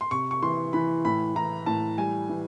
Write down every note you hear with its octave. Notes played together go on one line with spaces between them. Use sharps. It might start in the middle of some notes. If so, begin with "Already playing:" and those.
C6
C3 C#6
C#6
E3 C6
E3 B5
A2 B5
E3 A#5
A2 A5
G3 G#5
E3